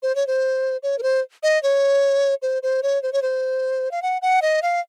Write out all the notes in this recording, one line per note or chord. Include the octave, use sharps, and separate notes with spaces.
C5
C#5
C5
C#5
A#4
C5
D#5
C#5
C5
C5
C#5
C5
C#5
C5
F5
F#5
F#5
D#5
F5